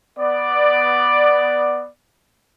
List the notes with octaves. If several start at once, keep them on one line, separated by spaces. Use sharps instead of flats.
B3 D5